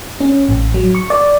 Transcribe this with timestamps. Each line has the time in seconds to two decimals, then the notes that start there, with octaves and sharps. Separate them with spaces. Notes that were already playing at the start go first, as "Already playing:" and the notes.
0.20 C#4
0.49 A1
0.74 F#3
0.95 C#6
1.10 D5